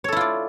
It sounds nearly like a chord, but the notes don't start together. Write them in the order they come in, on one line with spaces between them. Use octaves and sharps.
C#5 A4 E4 F4 D5